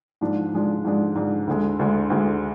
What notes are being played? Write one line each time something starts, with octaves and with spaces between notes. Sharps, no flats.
G#2 F3 G#3 D4
G#2 F3 G#3 D4
G#2 F3 G#3 D4
G#2 F3 G#3 D4
D2 D3 G#3
D2 D3 G#3
D2 D3 G#3